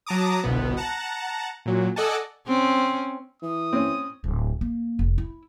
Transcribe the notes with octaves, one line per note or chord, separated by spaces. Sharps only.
F#3 A5 A#5 D6 D#6
G1 C2 B2 B3
F#5 A5 A#5
A#2 F#3
A4 D5 D#5 F#5 G#5 A5
C4 C#4
E3 D#6
C4 C#4
D1
A#3
F1
E4